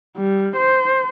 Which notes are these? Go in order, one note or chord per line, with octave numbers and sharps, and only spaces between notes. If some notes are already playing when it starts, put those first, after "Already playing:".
G3
C5